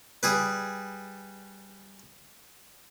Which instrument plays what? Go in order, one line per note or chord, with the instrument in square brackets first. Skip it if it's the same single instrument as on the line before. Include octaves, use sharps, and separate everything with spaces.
[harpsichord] G3 G#4 B4